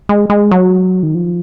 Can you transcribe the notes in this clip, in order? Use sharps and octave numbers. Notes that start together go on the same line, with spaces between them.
G#3
G#3
F#3
D#3
F3